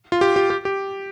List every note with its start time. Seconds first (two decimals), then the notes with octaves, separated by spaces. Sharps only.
0.12 F4
0.21 G4
0.36 G4
0.50 G4
0.65 G4